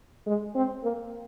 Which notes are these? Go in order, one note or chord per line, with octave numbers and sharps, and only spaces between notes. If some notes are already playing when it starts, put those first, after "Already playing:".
G#3
C4
A#3